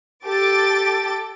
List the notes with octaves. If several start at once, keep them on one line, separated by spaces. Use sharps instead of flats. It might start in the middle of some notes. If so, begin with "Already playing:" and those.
G4 A4 D6 A6 D7